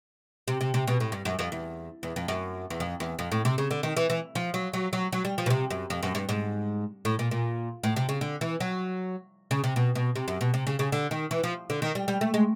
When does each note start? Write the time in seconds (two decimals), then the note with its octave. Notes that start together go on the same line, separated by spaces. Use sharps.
0.48 C3
0.61 C3
0.74 C3
0.87 B2
1.00 A2
1.12 G2
1.25 F#2
1.39 F2
1.52 E2
2.03 E2
2.16 F2
2.28 F#2
2.70 E2
2.80 F2
3.00 E2
3.19 F2
3.32 A2
3.45 C3
3.58 C#3
3.71 D3
3.83 D#3
3.97 E3
4.10 E3
4.35 F3
4.54 F#3
4.73 F#3
4.93 F#3
5.13 F#3
5.25 G3
5.38 F3
5.46 B2
5.50 C3
5.70 F#2
5.90 F2
6.03 F#2
6.15 G2
6.29 G#2
7.05 A2
7.19 A#2
7.31 A#2
7.84 A2
7.96 C3
8.09 C#3
8.21 D3
8.41 E3
8.60 F#3
9.51 C#3
9.64 C3
9.76 B2
9.95 B2
10.16 C3
10.28 F#2
10.41 B2
10.54 C3
10.67 C#3
10.79 C#3
10.92 D3
11.11 D#3
11.31 E3
11.43 F3
11.70 D3
11.82 D#3
11.95 G3
12.08 G3
12.21 A3
12.34 G#3